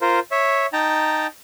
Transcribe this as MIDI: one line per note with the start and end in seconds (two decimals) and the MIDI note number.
0.01 0.19 65
0.01 0.19 70
0.01 0.19 72
0.31 0.66 73
0.31 0.66 76
0.73 1.27 63
0.73 1.27 79
0.73 1.27 81
0.73 1.27 82